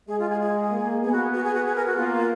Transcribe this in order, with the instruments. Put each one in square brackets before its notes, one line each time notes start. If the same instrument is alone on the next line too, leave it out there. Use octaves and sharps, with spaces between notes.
[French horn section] G#3 [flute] G#4
[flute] F4
G#4
G#4
[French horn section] A#3
[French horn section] B3 [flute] G#4
[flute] F#4
F#4
G#4
F#4
G#4
A#4
F#4
[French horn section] A#3 [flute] F4